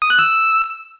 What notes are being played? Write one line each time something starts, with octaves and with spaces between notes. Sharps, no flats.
D#6
F#6
E6